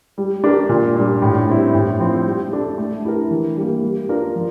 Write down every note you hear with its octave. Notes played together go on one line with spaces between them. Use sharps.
G3
D4 G4 A#4
A#2
G3 D4
A2
G3 C4 E4
A2
F3 C4
G3
D4 A4
A3
E4 G4 A#4
E3
G3 A#3
G3
D4 F4 A#4
F3